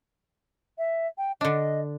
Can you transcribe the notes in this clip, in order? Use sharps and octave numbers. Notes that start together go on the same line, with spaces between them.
E5
G5
D3 D4 D#5